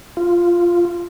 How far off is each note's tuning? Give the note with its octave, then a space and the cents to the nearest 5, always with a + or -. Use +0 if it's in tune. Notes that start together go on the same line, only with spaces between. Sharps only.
F4 -5